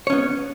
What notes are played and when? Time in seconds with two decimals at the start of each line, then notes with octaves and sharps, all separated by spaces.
0.07 C#5
0.10 C#4
0.13 B3